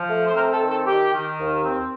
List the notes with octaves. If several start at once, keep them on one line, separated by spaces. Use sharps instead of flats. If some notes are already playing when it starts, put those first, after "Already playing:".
Already playing: F3
A3
C5
C4 A#4
A4
D#3
A4
D#3 G4
D#3
D#2
C4